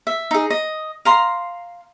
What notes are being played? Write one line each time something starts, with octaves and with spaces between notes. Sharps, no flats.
E5
D#4 G#4
D#5
F5 A#5 C6